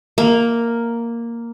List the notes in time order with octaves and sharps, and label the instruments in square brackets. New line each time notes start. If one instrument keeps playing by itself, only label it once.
[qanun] A#3